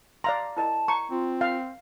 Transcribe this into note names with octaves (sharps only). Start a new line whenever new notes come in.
D5 F5 A#5 C6
E4 A#4 D#5 A5
A#5 C#6
C4 F4
F5